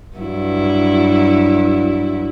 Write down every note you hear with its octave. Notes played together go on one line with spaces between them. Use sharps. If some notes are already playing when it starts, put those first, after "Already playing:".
G2 F#3 E4